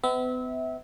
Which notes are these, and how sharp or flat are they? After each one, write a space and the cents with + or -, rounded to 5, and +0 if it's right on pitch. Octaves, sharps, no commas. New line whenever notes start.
B3 +40 E5 -25